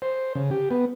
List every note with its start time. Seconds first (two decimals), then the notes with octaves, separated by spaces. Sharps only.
0.02 C5
0.35 C#3
0.51 G4
0.71 B3